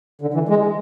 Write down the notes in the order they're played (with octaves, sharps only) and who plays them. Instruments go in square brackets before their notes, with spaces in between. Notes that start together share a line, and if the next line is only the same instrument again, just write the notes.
[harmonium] D3
E3
G#3